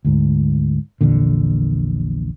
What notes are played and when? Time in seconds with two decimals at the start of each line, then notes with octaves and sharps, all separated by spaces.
0.05 D2 G#2
1.01 A#1 E2 A#2 D3